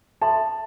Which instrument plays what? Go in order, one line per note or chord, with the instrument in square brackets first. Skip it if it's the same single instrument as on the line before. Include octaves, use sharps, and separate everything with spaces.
[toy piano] A4 E5 G5 C6 [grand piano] A5